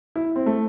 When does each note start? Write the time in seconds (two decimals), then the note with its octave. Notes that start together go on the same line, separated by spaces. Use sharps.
0.16 E4
0.36 C4
0.46 A3